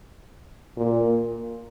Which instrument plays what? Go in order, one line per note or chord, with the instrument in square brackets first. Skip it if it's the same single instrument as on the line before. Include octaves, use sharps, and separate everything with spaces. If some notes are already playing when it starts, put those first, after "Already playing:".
[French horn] A#2